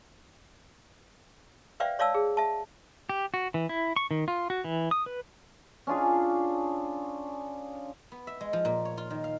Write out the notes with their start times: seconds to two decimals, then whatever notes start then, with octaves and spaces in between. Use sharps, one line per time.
1.80 B4 C5 D5 E5 F5 G5
1.99 C#5 D5 F5 A5 E6
2.14 G#4
2.37 E5 A5
3.09 G4
3.34 F#4
3.54 E3
3.69 E4
3.96 C#6
4.11 D#3
4.28 F4
4.50 F#4
4.64 E3
4.91 D#6
5.06 B4
5.87 C#4 D4 F4 G#4
8.12 B3
8.27 E5
8.41 G#3
8.53 F3
8.65 A#2
8.85 C#5
8.97 F4
9.10 D#3
9.24 F5